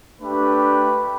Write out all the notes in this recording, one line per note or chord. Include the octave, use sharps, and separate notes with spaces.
A3 D4 G4 B4